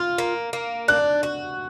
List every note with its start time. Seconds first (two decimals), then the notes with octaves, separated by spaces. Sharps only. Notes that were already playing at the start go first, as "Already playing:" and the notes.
Already playing: F4 F6
0.18 A#3
0.53 A#3
0.88 D4 F#6
1.23 F#4